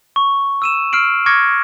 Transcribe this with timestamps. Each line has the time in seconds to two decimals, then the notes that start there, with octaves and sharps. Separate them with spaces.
0.16 C#6
0.62 E6 D#7 E7
0.93 E6 F6 C7 D7 F#7
1.26 C#6 D6 F6 G#6 A#6 C#7